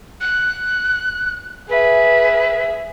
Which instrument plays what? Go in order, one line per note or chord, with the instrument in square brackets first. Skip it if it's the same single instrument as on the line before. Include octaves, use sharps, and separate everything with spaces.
[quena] F#6
[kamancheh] G#4 E5 [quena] B4